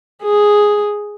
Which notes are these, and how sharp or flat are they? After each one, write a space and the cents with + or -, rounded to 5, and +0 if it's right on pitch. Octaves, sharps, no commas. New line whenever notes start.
G#4 +0